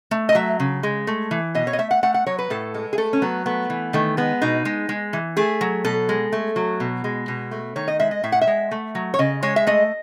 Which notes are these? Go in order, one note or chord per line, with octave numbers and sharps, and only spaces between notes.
A3
D#5
F#3 E5
C#3
G#3
A3
E3
B2 D#5
C#5
D#5
A3 E5
F#5
A3 F#5
F#5
F#3 C#5
B4
A2 A4
G#3
G#4
A3 A4
C#4
F#3 B3
A3 B3
E3
D#3 A3
G#3 B3
B2 D#4
G#3
G#3
E3
A3 G#4
F#3
B2 A4
G#3
A3
F#3
B2
G#3
B2
A3
D#3 C#5
D#5
G#3 E5
D#5
A2 E5
F#5
E5
G#3
A3
F#3
C#5
C#3 D#5
G#3 C#5
E5
A3 D#5